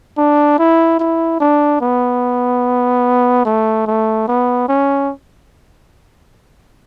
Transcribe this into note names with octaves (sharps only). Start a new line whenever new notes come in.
D4
E4
E4
D4
B3
A3
A3
B3
C#4